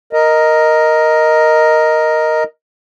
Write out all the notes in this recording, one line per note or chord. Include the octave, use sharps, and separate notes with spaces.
A#4 D#5